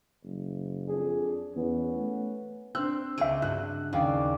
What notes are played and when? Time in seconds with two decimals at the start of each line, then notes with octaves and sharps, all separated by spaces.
0.24 F#1
0.87 F2 D4 G#4
1.56 E2 B3 C#4
1.95 A3
2.75 C4 D4 E6 F#6
3.18 C#2 C4 G#4 E5 C#6 D7 D#7
3.42 G2 F#4 F#6
3.93 D#2 C#3 C#4 D5 F5 G5